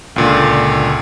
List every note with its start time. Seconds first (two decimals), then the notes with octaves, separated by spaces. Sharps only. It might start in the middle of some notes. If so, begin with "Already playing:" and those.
0.16 C#2 A#2 D3